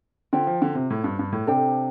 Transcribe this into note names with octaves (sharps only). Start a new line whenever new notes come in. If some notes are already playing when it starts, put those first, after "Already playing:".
D3 F4 C5 G5
F3
D3
C3
A2
G2
G2
A2
C3 D4 A4 C5 G5